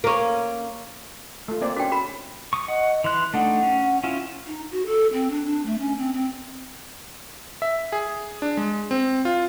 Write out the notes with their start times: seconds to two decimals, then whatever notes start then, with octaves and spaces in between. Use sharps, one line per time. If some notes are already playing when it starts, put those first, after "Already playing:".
0.04 A#3 C#4
1.48 A3 F4
1.62 A#3 C4 D5
1.77 C#4 D4 F#4 G5
1.92 F#4 A#4 B5
2.53 C#6 D#6
2.68 D#5 F#5
3.04 E3 C6 F#6
3.34 A3 D4 D#4 F#5
3.63 C#4
4.04 C#4 E4 F4
4.47 D#4
4.71 F#4
4.86 A4
5.13 C4
5.31 D4
5.45 D4
5.66 A3
5.79 C#4
5.98 C4
6.13 C4
7.62 E5
7.92 G#4
8.42 D4
8.57 G#3
8.91 C4
9.25 F4